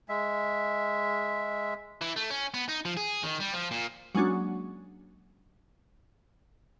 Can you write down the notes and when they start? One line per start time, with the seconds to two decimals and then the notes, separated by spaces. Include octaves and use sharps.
0.09 G#3 E5
2.01 E3
2.16 A3
2.30 C#4
2.54 B3
2.69 D#4
2.85 F3
2.97 G#4
3.23 D#3
3.40 G3
3.53 F3
3.71 A#2
4.15 F#3 G#3 A#3 C#4 D4 F#4